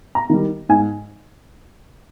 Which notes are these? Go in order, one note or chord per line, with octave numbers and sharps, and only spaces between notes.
A#5
D#3 G3
G#2 G#5